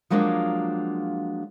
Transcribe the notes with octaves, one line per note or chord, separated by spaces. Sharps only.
F3 F#3 G#3 A#3 D4 F4